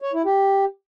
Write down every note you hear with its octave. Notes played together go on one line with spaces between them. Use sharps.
C#5
E4
G4